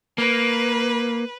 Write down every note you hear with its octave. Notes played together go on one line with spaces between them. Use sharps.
A#3 B4